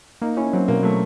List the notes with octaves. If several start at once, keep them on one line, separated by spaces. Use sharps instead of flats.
A#3 D#4
C#4 E4
F#3 C4
B2 A#3
F#3 A3